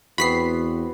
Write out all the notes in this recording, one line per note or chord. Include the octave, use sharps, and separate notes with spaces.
E2 B3 C4 F#4 B5 B6 C7